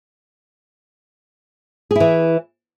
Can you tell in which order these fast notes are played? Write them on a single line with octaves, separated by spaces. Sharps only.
G#4 E4 E3